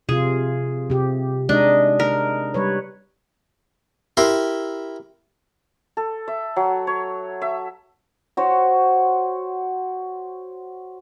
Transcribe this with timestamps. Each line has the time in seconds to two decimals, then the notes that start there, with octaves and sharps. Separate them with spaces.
0.09 C3 F4 G#4
0.90 C3 G4
1.49 G#3 D4 D#4 D#5
2.00 A#4
2.54 G3 B4 C#5
4.17 E4 G4 A#4 C6
5.97 A4
6.28 E5
6.56 F#3
6.87 C#5
7.42 E5
8.37 F#4 C5 C#5